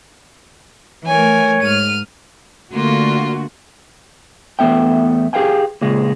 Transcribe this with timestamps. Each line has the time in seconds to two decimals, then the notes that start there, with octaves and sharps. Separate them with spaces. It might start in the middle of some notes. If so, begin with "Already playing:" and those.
1.07 E3 A3 A#4 C#5 G#5
1.62 G#2 F6 D#7
2.73 D3 A3 A#3 F4 F#4
4.59 E2 A3 B3 E5 G5
5.33 G4 G#4 B4 F5 G5 G#5
5.81 A#2 C#3 G#3